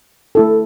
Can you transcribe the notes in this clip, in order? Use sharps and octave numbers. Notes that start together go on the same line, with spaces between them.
A3 E4 A4